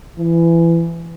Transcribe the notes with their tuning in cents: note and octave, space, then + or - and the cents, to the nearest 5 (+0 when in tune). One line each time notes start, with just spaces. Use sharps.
E3 +25